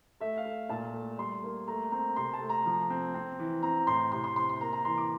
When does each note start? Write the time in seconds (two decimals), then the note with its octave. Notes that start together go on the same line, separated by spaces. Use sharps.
0.20 A3 E5
0.37 F5
0.45 A3
0.69 A#2 A5
0.93 A3
1.18 G3 C6
1.44 A#3
1.67 A3 A#5
1.91 C4 A#5
2.16 C3 C6
2.33 A5
2.40 A3
2.49 A#5
2.66 F3
2.90 C4
3.14 C4
3.39 E3
3.63 C4 A#5
3.87 A2 C6
4.12 C3 C6
4.24 C6
4.36 C4 C6
4.49 C6
4.61 A#3 A#5
4.73 A#5
4.85 E3 C6
4.98 D6